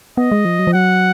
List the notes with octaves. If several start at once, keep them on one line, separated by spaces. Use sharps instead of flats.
B3 D#5
G#3
F3
F#3
F3
F#3 F#5